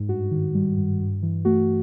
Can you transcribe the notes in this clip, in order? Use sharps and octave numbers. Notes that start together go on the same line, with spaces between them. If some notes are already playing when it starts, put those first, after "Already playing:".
Already playing: G#2
G2 F#4
D#3
G3
G2
G2
E3
A3 F#4